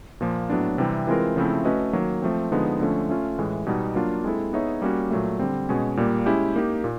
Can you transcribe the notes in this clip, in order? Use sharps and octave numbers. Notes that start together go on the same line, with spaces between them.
A#2 F3 A#3
A2 F#3 B3 D4
C3 E3 G3 C4
E3 G#3 C4 F4 A#4
C#3 F3 A3 C4 E4
A3 C#4 F#4 B4 D#5
D#3 F#3 A#3
F3 A3 C4
D3 F3 G#3 B3 D#4
D3 F3 A3 C#4
A3 C#4 F4
A2 E3 G#3
B2 G3 B3 D#4
F#3 A#3 D4 F4
G#3 C4 E4 A4
B3 D#4 G#4 C#5 E5
G3 A#3 C#4 F#4
A#2 F#3 A3
D3 G3 C4
B2 G#3 C#4
A#2 G3 A#3
G#3 C#4 E4 G4
A#3 D#4 G4
A#2